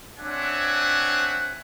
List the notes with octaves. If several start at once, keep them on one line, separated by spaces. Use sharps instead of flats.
C4 D4 C#5 E5 F#5 G#5